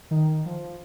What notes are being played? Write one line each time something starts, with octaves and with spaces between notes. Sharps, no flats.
D#3
F3